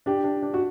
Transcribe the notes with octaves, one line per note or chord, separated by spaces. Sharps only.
D4 G4
D4
D4
F#4